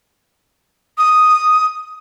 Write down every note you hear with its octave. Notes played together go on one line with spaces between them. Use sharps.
D#6